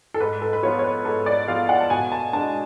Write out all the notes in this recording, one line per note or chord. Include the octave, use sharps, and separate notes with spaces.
A4
G#2 B4
A4
B4
F3 B3 F4 C#5
C#5
B4
G#2 A4
D5
F3 B3 F4 F5
F#5
A5
B2 G#5
A5
G#3 D4 A5